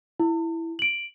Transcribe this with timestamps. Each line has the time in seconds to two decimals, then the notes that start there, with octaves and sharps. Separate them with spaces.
0.20 E4
0.79 D7 F#7